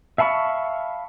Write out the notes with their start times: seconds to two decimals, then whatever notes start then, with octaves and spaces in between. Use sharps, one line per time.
0.18 E5 F5 A5 B5 C#6